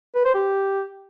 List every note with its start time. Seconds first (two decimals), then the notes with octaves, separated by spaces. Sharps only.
0.15 B4
0.25 C5
0.34 G4